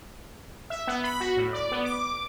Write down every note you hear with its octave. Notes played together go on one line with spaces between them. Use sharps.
E5
B3
B5
F#4
A2
D5
B3
D6